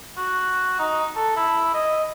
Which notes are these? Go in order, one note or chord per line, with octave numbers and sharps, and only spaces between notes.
F#4
D#4
A4
E4
D#5